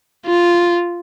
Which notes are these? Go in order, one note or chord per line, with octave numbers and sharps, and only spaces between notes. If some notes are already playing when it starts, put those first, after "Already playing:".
F4